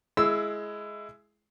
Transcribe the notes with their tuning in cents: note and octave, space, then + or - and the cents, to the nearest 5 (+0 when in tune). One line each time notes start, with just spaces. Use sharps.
G#3 +15 E4 +20 E6 +0